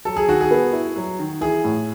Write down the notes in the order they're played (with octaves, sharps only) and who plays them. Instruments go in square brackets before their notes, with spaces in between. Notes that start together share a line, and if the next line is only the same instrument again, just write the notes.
[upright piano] F#3 [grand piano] A4
[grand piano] G#4
[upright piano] D#3 [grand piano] F#4
[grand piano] G#4
[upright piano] B3
E4
F#3
D#3
[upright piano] E3 [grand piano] G#4
[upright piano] A2